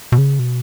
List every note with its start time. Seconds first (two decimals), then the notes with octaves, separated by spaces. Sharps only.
0.12 B2
0.18 C#3
0.39 B2